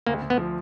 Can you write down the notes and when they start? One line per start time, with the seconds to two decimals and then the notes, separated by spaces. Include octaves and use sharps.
0.07 D2 A#3
0.22 D2
0.30 B3
0.38 F3